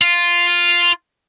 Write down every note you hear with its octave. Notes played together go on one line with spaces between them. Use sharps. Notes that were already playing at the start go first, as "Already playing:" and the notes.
F4